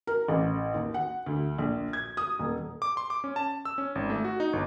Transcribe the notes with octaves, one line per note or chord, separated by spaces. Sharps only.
A#4
A1
D#2
F#5
D2
A#1
G#6
D#6
D#1
D6
C6
D6
C#4
A5
E6
C#4
G#1
A3
F#4
D#4
G1